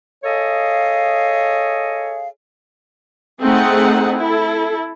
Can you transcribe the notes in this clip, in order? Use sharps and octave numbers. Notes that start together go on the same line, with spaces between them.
G#4 A4 C#5 D#5 F5
A3 C4 D#4 G#4 F#5
E4 A4